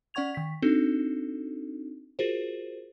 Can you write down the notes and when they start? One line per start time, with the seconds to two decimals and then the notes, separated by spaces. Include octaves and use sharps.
0.14 C#4 D5 F#5 C#6 G#6 F7
0.35 D#3 B6
0.62 C4 D4 D#4 F#4 A4
2.19 F4 F#4 G#4 A#4 C5